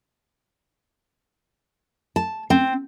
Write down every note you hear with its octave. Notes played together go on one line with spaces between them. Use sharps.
A5
C4